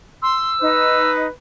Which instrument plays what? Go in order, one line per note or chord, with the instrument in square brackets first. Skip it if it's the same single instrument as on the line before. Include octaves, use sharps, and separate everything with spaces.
[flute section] C6 [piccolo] E6
[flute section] D#4 [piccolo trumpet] B4